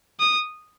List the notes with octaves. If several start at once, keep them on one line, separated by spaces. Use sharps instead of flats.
D#6